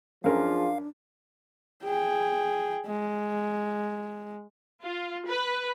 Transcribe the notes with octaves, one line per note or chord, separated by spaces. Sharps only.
F#2 F3 C#4 D4 F4 G#4 A#4 F5
G#4 G5
G#3
F4
B4